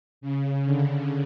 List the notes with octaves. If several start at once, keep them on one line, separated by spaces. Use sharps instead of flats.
C#3
D3